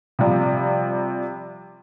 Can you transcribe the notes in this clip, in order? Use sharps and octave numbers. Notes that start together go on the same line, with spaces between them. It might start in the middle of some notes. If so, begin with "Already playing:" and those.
C3 F3 G3